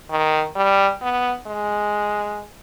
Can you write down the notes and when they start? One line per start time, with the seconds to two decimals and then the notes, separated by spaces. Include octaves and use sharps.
0.10 D#3
0.56 G3
1.02 B3
1.47 G#3